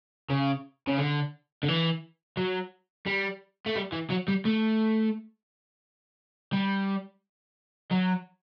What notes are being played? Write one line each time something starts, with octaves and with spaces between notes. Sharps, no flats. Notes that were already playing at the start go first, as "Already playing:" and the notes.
C#3
C#3
D3
D3
E3
F#3
G3
A3
G3
E3
F#3
G3
A3
G3
F#3